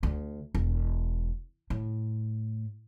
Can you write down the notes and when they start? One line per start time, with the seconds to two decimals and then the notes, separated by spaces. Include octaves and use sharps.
0.03 D2
0.55 E1
1.70 A2